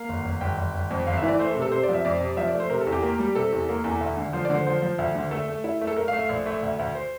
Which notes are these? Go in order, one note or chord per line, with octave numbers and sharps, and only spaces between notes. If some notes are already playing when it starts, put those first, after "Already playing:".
Already playing: A#3 F5
G1
G1
G1 G5
G1
G1
F2
G1 F5
E5
E3
D5
A3 C5
A4
C3
A4
C3 C5
D5
F3
E5
F2 D5
C3
F3 E5
D5
A3
C5
C3 A#4
A4
E2
G4
A#3
G3
C3 A4
E2
A#3
E2
D2
D3
F3 C5
D5
D3
C5
F3 C5
F3
D2
D3
A3 A4
A3
E4
A3
A4
A3 A#4
F5
A3
F5
A#1
A3
D2
D2
C5